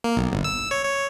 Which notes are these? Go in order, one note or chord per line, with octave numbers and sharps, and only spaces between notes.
A#3
B1
G1
E6
C#5
C#5